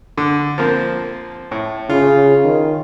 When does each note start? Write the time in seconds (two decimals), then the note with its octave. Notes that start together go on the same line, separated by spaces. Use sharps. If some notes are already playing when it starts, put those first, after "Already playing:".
0.18 D3
0.58 F3 A#3 C4
1.51 A2
1.90 C#3 F4
2.45 D#3